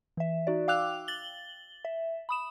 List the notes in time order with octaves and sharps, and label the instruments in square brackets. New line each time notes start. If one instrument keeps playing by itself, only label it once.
[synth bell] E3 E5
D#4 F#4 D5
F5 G5 D6 E6 F#6 F7
A6 F#7 G7
E5
B5 D#6 E7